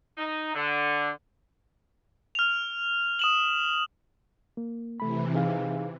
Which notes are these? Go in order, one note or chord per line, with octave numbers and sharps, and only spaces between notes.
D#4
D3
F6 F7
D#6 E7 F#7
A#3
C3 E3 A3 B5
D#4 G#4 F5